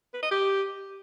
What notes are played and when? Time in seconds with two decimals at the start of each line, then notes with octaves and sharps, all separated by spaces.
0.14 B4
0.22 D#5
0.31 G4